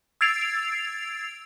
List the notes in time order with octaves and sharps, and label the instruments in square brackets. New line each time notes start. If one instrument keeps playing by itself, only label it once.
[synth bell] E6 G#6 A6 C7 D7 F7